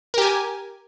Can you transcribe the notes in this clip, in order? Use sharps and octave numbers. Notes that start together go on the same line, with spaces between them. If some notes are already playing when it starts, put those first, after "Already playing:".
G4 A#4 G#5